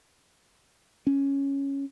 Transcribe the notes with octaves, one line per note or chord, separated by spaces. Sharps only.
C#4